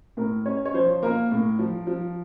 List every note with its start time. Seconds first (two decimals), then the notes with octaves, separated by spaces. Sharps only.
0.17 A2 A#4
0.46 C#4 C#5
0.65 C#5
0.74 F3 C5
1.03 A#3 A#4
1.31 A2
1.59 F3
1.87 F3